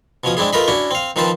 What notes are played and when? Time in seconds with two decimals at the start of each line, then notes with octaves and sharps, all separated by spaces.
0.24 B2 F3 C#4 D#6
0.37 G#3 C4 D4 E4 G#4
0.53 A3 F4 A#4 B4 D#5 B5
0.68 C#4 D4 E4 F#4
0.91 C4 F5
1.16 D#3 F3 C4 B4 C5 A5